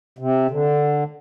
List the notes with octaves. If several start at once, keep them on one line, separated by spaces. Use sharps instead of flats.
C3
D3